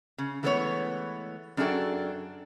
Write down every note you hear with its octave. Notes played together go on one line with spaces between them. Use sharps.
C#3
E3 G#3 A3 B3 D#4 C#5
F#2 D4 F#4 G#4 A4 G5